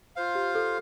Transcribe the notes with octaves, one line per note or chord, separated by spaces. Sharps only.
F4 C5 F5
G4
A4